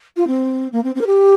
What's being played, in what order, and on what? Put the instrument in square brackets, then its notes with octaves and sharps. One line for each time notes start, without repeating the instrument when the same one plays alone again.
[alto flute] F4
C4
A#3
C4
C4
A#4
G4